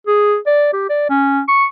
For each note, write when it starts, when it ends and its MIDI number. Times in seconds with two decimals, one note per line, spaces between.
0.07 0.37 68
0.46 0.69 74
0.73 0.86 67
0.90 1.10 74
1.10 1.41 61
1.48 1.65 85